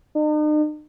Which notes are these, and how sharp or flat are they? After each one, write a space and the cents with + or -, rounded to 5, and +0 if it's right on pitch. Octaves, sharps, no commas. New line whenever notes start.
D#4 -45